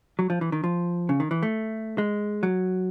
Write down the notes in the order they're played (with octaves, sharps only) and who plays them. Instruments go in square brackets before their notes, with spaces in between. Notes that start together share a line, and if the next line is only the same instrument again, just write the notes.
[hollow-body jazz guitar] F#3
F3
E3
D#3
F3
C#3
D#3
E3
A3
G#3
F#3